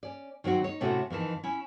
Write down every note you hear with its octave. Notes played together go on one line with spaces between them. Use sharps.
C#4 D5
D#3 F#3 C4 F#4
D#4 C#5
A2 C3 A3 C#4 E4 F#4
F2 D#3 E3 A5
C#4 E4